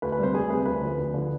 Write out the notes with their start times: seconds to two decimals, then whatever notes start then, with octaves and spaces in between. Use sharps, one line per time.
0.02 D2 B4
0.12 B4
0.18 C3 G3 C5
0.34 D2 G#4
0.50 C3 G3 B4
0.65 D2 B4
0.81 D3 F3
0.98 D2
1.14 D3 F3